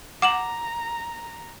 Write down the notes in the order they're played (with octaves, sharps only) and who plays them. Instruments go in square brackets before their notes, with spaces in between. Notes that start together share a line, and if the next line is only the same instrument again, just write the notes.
[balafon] F#5 [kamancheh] A#5 [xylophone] D6 E7 F#7